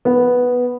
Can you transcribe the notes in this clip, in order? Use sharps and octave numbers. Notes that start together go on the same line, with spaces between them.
B3